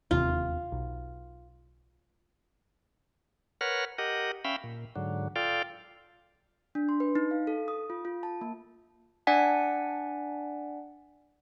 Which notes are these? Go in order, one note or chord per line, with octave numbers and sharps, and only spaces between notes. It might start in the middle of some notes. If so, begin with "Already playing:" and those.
E1 D#2 C3 F4
B1
A#4 B4 C#5 F#5 F6
G4 A#4 D#5 F#5
C#4 E5 F5 G5 B5
A#2
G#2 D3 F#3
F4 A4 D5 F5 G5
D4
C6
B4
D#4
F5
A4
D#6
F4
F4
A5
A#3
D4 D5 F#5 G#5 B6